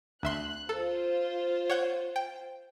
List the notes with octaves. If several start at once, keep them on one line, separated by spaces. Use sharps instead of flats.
D2 E5 C6 F#6
F4 A4 C5
C#5 F#5 G6
G5